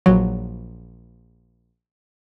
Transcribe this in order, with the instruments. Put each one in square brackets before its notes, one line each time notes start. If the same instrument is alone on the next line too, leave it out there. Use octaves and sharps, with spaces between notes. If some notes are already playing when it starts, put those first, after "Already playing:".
[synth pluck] A#1 F#3